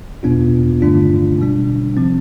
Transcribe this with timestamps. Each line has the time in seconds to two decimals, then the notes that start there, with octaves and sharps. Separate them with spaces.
0.23 E2 B2 B3 D4 F4
0.81 G2 D3 A3 D4 F4
1.39 B2 G3 D4
1.97 C3 F3 C4